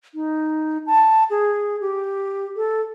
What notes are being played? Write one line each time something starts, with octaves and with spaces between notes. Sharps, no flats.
D#4
A5
G#4
G4
A4